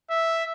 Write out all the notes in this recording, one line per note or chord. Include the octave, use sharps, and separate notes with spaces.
E5